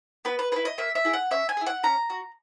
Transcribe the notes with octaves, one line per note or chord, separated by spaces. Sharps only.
B3 B4
B4
E4 G#4 B4
D#5
A#3 E5
E5
E4 G#4
F#5
C#4 E5
G#5
E4 G#4
F#5
C#4 A#5
F#4